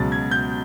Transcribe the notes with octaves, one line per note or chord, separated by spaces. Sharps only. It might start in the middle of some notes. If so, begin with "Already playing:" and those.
Already playing: C#2 B2 F#3 A6
G#6
G6